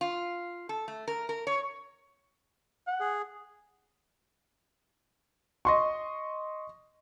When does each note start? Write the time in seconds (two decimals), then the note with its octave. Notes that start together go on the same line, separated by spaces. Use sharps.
0.01 F4
0.69 A4
0.88 A3
1.08 A#4
1.29 A#4
1.47 C#5
2.87 F#5
3.00 G#4
5.65 D#5 C6 C#6